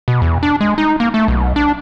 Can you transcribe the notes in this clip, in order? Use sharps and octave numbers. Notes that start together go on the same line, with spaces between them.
B2
E2
D4
G#3
D#4
A#3
A3
B1
D4